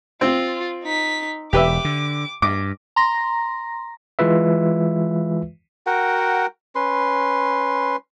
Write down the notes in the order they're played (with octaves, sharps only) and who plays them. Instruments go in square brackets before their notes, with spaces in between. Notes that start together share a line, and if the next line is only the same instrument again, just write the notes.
[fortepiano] C4 [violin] F4
[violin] D#4 B6
[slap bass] E1 [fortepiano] G4 B4 E5 [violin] D6
[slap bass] D3
[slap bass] G2 [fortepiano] D6
[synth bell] A#5 C6 A#6
[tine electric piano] E3 G#3 F4 B4 E5
[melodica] F#4 A#4 F#5 G5
C#4 B4 C6